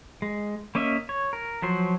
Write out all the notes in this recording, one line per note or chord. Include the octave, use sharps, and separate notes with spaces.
G#3
A#3 C#4 D#5 E5
C#5
A#4
F3 F#3 C5